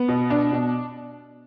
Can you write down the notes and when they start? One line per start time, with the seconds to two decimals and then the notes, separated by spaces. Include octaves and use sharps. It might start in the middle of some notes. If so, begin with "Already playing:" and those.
Already playing: B3
0.08 B2
0.30 D4
0.52 B2